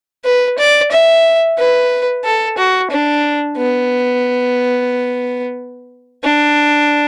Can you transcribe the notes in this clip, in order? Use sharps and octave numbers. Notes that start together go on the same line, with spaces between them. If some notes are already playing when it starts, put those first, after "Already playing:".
B4
D5
E5
B4
A4
F#4
D4
B3
D4